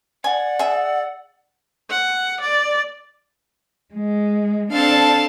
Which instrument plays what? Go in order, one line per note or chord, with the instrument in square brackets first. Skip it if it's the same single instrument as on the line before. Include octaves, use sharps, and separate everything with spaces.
[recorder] D5 [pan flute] F#5 [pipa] G#5
[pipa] G#4 E5
[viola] F#5
D5
[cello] G#3
[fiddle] C4 A5 [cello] D4 [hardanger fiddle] A4 F5